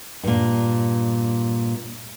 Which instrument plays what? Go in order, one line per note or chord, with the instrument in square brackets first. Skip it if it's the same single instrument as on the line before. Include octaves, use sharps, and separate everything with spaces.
[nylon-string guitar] G2 A#2